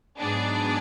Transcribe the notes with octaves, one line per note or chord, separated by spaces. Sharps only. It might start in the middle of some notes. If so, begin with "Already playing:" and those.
G#2 F#3 B3 D4 G#4